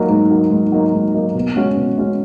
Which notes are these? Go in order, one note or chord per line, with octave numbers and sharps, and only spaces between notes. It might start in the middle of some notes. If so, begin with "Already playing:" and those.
Already playing: F#3 A#3 D#4
G#2
F#3 A#3 D#4
G#2
F#3 A#3 D#4
G#2
F#3 A#3 D#4
B2
G#3 C#4 F#4
B2
G#3 C#4 F#4